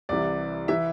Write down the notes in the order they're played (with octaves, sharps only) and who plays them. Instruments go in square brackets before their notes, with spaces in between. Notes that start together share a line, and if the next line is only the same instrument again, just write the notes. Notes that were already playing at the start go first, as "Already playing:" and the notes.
[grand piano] C2 C3 E3 D5
E3 E5